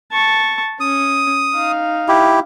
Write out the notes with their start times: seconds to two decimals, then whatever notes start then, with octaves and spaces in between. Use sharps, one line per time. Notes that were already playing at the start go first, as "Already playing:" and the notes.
0.13 A5 C#6
0.80 C#4 D#6
1.55 D#4 F5
2.08 E4 G4